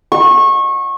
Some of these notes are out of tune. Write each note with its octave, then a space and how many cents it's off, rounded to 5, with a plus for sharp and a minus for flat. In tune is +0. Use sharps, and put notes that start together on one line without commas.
C#6 -25